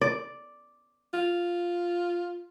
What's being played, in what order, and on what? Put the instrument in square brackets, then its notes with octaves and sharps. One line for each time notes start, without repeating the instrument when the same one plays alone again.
[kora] D5
[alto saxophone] F4